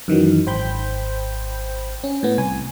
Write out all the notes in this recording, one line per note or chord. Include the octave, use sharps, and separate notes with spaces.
F#2 D#3 E3 F#3
G#1 C5 G5 B5 G6
C#4
A2 B3
C2 G#5